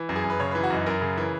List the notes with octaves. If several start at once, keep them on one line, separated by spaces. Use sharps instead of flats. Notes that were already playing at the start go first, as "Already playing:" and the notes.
Already playing: E3
F#2
G#4
F#2
B4
C#3 C#5
E3 B4
F#4
F#2 D#4
F#2 A#4
C#3
E3